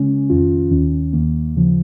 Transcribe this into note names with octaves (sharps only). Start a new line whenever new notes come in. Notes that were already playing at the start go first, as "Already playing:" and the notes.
Already playing: C#3 G#3 C#4
F2 D#3 C#4 F4
D#2 D#3 C#4
D#2 D#3 A#3
D#2 C#3 F3